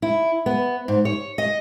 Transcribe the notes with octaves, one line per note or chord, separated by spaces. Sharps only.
E4
B3
G#2
C#5
D#5